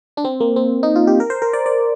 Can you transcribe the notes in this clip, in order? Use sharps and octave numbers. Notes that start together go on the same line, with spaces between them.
D4
C4
A#3
C4
D#4
F4
G4
A#4
C5
A#4
D5
D5